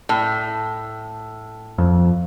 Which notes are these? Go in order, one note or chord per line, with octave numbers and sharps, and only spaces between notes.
A2
F2